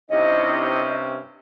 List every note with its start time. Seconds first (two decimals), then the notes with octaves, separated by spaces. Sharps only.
0.11 G2 C3 C#4 D#4 E4 D#5